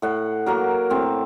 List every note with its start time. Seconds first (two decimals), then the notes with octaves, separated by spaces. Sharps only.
0.02 A2 F#5
0.46 F#3 A#3 A#4
0.90 A2 C4